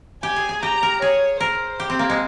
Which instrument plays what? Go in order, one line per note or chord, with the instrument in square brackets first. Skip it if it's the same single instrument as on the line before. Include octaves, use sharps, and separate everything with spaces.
[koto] G4 [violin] G#5
[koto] G#4
G#4
[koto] G4 [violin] A#5
[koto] A#4
[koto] G#4 [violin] C#5
[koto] A#4 [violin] C5
[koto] G4
C4
A#3
G#3